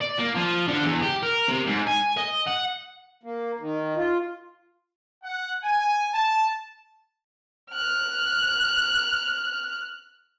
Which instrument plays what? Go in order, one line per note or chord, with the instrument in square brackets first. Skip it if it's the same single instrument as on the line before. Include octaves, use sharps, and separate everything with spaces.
[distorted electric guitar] D5
A#3
F3
D3
E2
G4
A#4
C3
G#2
G#5
D#5
F#5
[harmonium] A#3
D#3
F4
[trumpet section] F#5
G#5
A5
[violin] F6 F#6